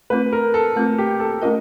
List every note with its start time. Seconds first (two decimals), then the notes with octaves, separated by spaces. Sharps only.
0.10 A3 C4 F4 B4
0.33 A#4
0.54 A4
0.76 A3 C4 F4
0.98 G4
1.20 A4
1.42 A3 C#4 F4 A#4 D#5